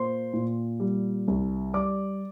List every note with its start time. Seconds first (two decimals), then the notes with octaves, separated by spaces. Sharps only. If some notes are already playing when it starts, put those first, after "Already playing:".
Already playing: A#2 A#3 C5 C6
0.33 A#2
0.80 G3
1.28 C2
1.74 G3 D5 D6